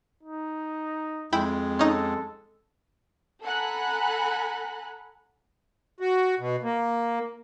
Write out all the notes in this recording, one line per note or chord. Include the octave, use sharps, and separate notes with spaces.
D#4
F2 G#3 E4 G5 B5
C#4 D#4 A4
A4 F#5 G#5 A#5 B5 F#6
F#4
B2
A#3